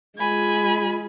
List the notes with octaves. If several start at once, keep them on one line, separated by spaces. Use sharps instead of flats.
G#3 F4 G#5 B5